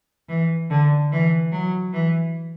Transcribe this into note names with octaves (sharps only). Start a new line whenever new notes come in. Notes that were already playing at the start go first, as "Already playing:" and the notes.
E3
D3
E3
F#3
E3